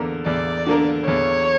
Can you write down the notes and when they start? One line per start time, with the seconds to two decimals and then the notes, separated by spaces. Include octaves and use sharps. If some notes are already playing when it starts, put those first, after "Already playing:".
Already playing: E2 D3 A#3 D4 A#4
0.26 E2 D5
0.66 D3 A#3 D4 A#4
1.07 E2 C#5